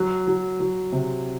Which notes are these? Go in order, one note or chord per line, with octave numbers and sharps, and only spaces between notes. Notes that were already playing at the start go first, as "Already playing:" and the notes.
Already playing: F#3
F#3
F#3
C3